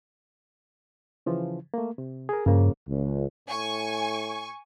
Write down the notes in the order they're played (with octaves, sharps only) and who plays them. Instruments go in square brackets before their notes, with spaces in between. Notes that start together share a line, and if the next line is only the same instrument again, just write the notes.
[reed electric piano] C#3 E3 F3
A3 A#3
C3
G#4 A#4
[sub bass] G2 [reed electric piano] C#3 F3 A#3
[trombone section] C#2
[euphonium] A2 [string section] G#5 C#6